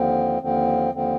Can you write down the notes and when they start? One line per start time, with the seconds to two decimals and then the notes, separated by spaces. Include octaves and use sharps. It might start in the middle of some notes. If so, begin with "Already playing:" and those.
Already playing: D#2 D3 F3 C4
0.41 D#2 D3 F3 C4
0.92 D#2 D3 F3 C4